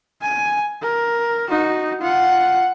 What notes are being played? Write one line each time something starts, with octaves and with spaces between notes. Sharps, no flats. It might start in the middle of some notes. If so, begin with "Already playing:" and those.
G#5
A#4
D#4 F#4
F4 F#5